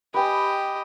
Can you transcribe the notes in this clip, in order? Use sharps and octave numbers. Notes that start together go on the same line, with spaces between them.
G4 B4 D#5 G5 G#5